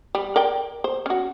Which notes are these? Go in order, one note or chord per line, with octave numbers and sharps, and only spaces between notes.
G3
A#4 D5 G5
C5
C#4 F#4